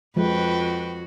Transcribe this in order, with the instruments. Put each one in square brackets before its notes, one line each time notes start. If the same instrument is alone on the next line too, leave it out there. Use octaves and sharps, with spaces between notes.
[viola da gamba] F2 F#4 [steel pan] F3 G#3 [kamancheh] B4 G5